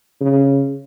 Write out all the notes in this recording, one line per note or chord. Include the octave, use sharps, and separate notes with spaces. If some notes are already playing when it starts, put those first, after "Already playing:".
C#3